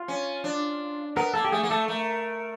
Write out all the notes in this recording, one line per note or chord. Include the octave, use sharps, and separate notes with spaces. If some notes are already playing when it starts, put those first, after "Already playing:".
Already playing: F4
C#4
D4
B3 A#4
A#3 A4
G4
A3 G#4
A#3
A3 A4
A3 A#4